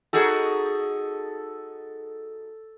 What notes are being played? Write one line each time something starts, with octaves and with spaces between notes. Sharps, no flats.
D#4 F#4 G#4 A4